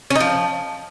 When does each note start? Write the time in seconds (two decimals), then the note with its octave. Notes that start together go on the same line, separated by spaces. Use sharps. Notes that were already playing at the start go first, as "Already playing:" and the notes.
0.10 C#4
0.15 D#4
0.21 F3